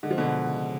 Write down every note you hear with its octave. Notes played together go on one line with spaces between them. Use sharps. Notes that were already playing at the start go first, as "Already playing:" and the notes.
D3 G#3
F3
B2 D3
F3
C#3